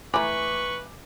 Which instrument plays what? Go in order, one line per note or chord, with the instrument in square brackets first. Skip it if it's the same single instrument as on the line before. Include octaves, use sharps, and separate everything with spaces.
[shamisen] E3 A3 [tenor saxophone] B4 [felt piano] G#5 A#5 D6 [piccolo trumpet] C#6